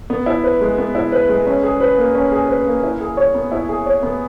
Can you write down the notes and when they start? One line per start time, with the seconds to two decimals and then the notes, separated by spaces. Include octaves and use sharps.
0.10 B3
0.26 E4
0.44 B4
0.61 G#3
0.78 B3
0.95 E4
1.12 B4
1.29 G#3
1.46 C#4
1.64 G#4
1.80 B4
1.98 A#3
2.15 C#4
2.32 G#4
2.49 B4
2.66 A#3
2.83 E4
3.00 G#4
3.17 C#5
3.35 B3
3.52 E4
3.69 G#4
3.86 C#5
4.03 B3